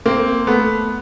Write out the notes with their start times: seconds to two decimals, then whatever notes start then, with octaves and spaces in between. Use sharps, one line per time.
0.06 A#3 C4
0.47 A3 B3